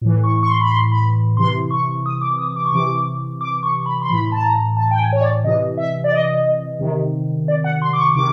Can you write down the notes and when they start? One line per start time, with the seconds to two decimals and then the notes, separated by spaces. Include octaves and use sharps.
0.01 A2 E3
0.24 C#6
0.43 C#6
0.47 C6
0.61 B5
0.70 C6
0.92 B5
1.37 C3 E3 C6
1.71 C#6
2.06 D#6
2.21 D6
2.38 D#6
2.56 D6
2.65 C#6
2.72 C3 E3 D6
3.41 D6
3.63 C#6
3.86 B5
4.02 C6
4.08 A2 E3 B5
4.32 A5
4.42 A#5
4.77 A5
4.91 G5
4.99 G#5
5.13 C#5
5.21 D5
5.44 C3 E3 D#5
5.77 E5
6.04 D5
6.12 D#5
6.79 C3 D#3
7.48 D5
7.64 F#5
7.82 C6
7.93 D6
7.98 C#6
8.15 C3 D#3 D6